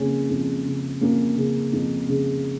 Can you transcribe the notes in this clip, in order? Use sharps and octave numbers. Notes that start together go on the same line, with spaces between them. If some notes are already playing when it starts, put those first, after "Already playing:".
Already playing: F2 C#3 A#3 C#4
F2
C#3
F2 A#3 C#4
C#3
F2
C#3